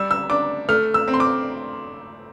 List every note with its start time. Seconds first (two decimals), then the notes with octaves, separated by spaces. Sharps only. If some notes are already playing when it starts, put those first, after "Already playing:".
Already playing: G3 E6
0.11 E6
0.30 D4 D6
0.69 A3 F6
0.94 E6
1.08 C4
1.14 C6
1.20 D6